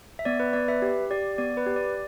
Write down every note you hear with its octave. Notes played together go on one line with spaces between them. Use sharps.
E5
B3 D5
B4
B3 D5
B4 E5
G4
G4 D5
B3 D5
B4
G4
D5